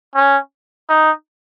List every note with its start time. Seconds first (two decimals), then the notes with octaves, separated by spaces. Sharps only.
0.15 C#4
0.89 D#4